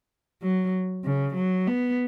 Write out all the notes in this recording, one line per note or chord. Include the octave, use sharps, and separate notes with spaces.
F#3
C#3
F#3
B3